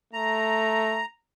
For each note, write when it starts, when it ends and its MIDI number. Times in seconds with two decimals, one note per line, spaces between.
0.13 1.02 57
0.13 1.05 82